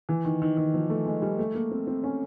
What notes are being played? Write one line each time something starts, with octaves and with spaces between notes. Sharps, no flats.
E3
D#3
D#3
D#3
F3
A3
G#3
G3
A3
A#3
C4
C4
C#4